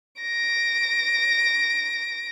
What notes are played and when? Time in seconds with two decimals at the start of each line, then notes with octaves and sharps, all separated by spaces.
0.21 A#6 D7